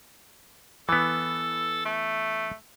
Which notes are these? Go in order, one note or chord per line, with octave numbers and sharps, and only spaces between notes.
E3 B3 A4
A3